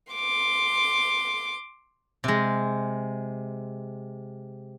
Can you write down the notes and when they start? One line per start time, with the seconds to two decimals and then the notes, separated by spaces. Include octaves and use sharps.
0.13 C6 D6
2.24 C3 G#3